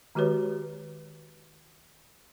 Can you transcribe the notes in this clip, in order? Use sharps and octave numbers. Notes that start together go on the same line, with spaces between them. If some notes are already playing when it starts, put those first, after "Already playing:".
D#3 G#3 F#4 G4 B4 C#5